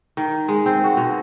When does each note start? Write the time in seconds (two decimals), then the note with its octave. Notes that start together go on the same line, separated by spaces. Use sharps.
0.17 D#3
0.48 G#3
0.66 C4
0.84 F#4
0.97 B2